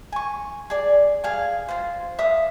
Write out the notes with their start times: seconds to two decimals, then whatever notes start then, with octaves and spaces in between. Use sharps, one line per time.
0.12 G#5 C#6
0.70 G#4 D5
1.24 G#4 F5 G#5
1.68 F4 C5
2.19 E5 F5 D#6